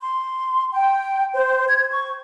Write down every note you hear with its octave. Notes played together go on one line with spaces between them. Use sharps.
C6
G5
C5
G#6
C#6